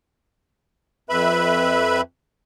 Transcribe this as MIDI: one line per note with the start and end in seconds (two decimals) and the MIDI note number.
1.10 2.01 41
1.10 2.01 71
1.10 2.01 76
1.10 2.01 83